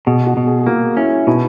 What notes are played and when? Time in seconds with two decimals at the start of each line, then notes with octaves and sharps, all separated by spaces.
0.06 B2 G#4
0.27 F#4
0.37 B2
0.47 G#4
0.59 G#4
0.67 A#3 F#4
0.96 C#4 E4
1.27 B2 D#4